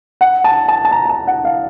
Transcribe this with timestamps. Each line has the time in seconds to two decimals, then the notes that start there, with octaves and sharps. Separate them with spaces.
0.21 F#5
0.44 A5
0.68 A5
0.85 A5
0.91 A#5
1.05 A#5
1.09 A5
1.27 F#5
1.45 F5